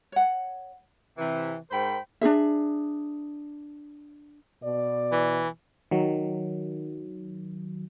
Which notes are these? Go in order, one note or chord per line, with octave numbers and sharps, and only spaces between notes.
C#5 F#5
C3 E3
G#2 A#4 C5 G5 B5
D4 E4 G#4 E5
B2 D5
E3
D#3 F#3